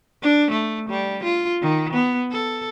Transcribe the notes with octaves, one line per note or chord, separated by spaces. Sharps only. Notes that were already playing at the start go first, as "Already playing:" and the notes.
D4
A3
G3
F4
D#3
B3
A4